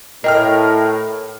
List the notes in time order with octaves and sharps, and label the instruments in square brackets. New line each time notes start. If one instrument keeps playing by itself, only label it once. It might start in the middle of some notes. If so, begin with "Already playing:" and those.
[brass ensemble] A2 [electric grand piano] A#4 G5 F6 [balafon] D#5